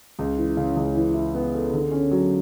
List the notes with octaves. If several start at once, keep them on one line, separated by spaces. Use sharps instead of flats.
C#2
E3
C#3
C#2
E3
E4
B3
A4
D3
C#4
F#3